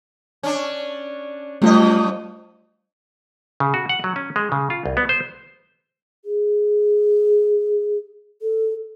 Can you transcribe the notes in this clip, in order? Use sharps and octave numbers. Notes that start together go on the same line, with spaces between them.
C#4 D4
F#2 F3 G3 A3 F4 D#5
C#3
F#4
F#5
F#3
C#4
G#3
C#3
F4
C2
B3
C5
G#4
A4